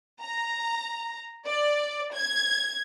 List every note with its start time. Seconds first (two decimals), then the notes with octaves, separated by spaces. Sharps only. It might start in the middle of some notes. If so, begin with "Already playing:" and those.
0.20 A#5
1.46 D5
2.14 G#6